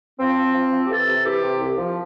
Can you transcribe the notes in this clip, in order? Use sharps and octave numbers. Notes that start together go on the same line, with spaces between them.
F3 C4
F3
F3
F3
G4
E3 A4
C3
E3 G4
C3
C2
F3